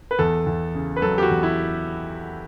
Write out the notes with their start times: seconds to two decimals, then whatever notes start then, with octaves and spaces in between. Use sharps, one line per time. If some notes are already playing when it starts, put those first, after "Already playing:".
0.11 B4
0.19 E2 A4
0.46 E2
0.75 C#3
0.96 B4
1.02 F#3 A4
1.18 G4
1.23 F#4
1.29 E2
1.43 E4